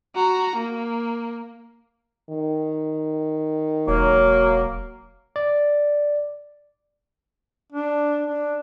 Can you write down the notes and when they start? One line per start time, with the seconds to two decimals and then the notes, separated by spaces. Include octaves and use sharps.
0.15 F#4 A#5
0.56 A#3
2.29 D#3
3.88 E1 F#3 A#3
5.36 D5
7.72 D4
8.27 D4